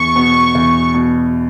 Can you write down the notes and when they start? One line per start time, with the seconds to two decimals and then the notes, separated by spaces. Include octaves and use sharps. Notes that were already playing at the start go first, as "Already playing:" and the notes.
Already playing: E2 C#6
0.15 B2 B3
0.55 E2
0.94 B2 B3